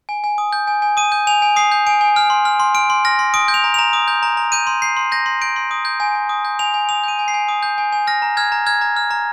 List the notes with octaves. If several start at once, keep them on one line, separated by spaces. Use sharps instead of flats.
G#5
G#5
D#6
G6
G#5
G#5
D#6 D#7
G6
G#5 F7
G#5
D#6 C7
G6
G#5 D7
G#5
F6
C6
F6
C6
F6 D7
C6
F6 A#6
C6
D#6 D7
G6
F7
A#5
A#5 F7
D#6
G6
A#5
A#5
G6 D#7
C6
G6 C7
C6
G6 A#6
C6
G6 D7
C6
D#6
G6
G#5
G#5
D#6
G6
G#5 F7
G#5
D#6 F7
G6 D#7
G#5
C7
G#5
D#6
G6
G#5
G#5
F6 A#6
A#5
F6 G#6
A#5
F6 G#6
A#5
F6
A#5